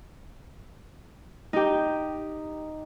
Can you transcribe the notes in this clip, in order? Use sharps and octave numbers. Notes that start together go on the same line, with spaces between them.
D#4 G4